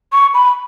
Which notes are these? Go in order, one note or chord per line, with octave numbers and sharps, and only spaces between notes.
C#6
B5